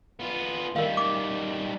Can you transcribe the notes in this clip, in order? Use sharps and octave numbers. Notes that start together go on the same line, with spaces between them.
B3 F4
D#3 G3 A#4 F5
D6